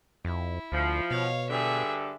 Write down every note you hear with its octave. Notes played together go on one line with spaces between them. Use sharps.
F2 E4
D2 F3
B2 C#5 F5
G2 D3 G#4 E5